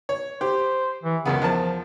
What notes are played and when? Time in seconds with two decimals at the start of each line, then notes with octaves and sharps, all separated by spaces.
0.09 C#5
0.41 G4 C5
1.03 E3
1.25 C#2 F#2 C#3 B3
1.41 E2 D#3 F3 A5